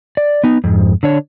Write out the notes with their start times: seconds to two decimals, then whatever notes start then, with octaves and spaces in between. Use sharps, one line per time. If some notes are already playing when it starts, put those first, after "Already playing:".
0.17 D5
0.44 B3 D#4
0.64 F2 G#2
1.03 D3 D4 C#5